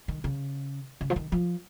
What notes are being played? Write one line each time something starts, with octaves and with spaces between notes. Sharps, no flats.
D#3
C#3
C#3
F3
D#3
F3